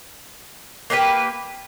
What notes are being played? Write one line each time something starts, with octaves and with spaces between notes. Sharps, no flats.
A#3 D4 G4 B4